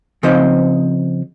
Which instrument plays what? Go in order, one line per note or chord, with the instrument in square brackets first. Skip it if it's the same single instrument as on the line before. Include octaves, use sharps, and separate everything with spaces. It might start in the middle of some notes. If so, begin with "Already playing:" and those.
[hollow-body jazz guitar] C#3 F3 C4 D#4 C5 D#5